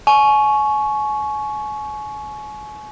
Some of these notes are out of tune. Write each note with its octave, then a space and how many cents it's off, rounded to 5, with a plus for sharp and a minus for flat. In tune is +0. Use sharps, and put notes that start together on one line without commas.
G#5 +35 C#6 +0